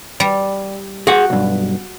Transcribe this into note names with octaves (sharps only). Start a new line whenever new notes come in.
G3
F#4 G#4 F#5
B1 G2